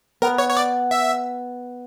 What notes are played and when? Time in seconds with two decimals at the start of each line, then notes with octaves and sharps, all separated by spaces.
0.22 B3 A#4
0.38 C#5
0.49 C#5
0.57 D5
0.91 E5